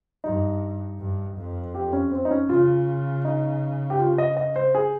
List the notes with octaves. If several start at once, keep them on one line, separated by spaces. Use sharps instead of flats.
G2 D#4
G2
F2
G4
C#4
C4
D#4
C#4
C#3 F4
D#4
G4
F4
D#5
D#5
C5
G#4